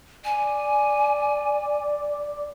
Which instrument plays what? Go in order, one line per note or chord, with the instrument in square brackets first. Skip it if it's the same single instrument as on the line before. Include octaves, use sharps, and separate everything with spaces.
[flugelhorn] D5 [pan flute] G#5